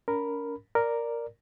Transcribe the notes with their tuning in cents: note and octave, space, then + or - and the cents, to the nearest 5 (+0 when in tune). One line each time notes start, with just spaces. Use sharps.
C#4 +45 A#4 +0 B5 +0
A#4 +0 D5 +0